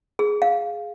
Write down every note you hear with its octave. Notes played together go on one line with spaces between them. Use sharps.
G#4
F5